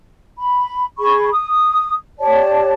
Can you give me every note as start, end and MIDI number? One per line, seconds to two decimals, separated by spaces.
0.38 0.85 83
0.98 1.30 68
0.98 1.30 83
0.98 1.30 85
1.32 1.94 87
2.19 2.73 67
2.19 2.73 73
2.19 2.73 74
2.19 2.73 81